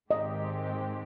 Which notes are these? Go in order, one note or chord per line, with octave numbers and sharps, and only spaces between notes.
G#2 D#3 G#3 C4 G4 D#5